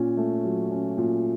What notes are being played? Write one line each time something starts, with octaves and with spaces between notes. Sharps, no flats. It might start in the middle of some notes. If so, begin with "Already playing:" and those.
Already playing: A#2 C#4
A3
F#3
C#4
A#2